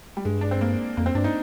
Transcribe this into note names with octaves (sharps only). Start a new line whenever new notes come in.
G3
G2 G#3
D4
C4
A#3
F2 A#3
C4
G2 D4
D#4